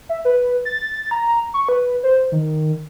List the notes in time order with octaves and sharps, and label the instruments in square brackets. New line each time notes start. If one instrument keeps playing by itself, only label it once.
[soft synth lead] E5
B4
A6
A#5
C#6
B4
C5
D#3